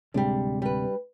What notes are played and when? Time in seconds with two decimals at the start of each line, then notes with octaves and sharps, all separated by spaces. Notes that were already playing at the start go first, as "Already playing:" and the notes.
0.14 D1 C3 G3 G#3 D4
0.62 G3 B4